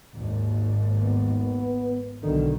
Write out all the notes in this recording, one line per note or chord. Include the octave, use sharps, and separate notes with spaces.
G#1 D#2
B3
B1 B2 D3 D#3